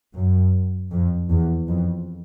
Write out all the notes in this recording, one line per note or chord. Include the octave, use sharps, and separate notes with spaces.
F#2
F2
E2
F2